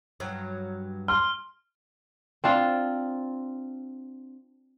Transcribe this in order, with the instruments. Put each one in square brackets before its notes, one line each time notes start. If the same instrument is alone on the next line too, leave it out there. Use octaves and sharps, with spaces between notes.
[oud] G2 F#3
[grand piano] C6 [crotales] F6
[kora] C4 D4 F4